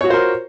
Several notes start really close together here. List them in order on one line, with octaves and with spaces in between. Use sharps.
C#5 F#4 F4 C5 A#4